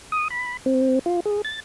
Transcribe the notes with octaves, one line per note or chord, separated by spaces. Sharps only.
D#6
B5
C4
F4
G#4
A6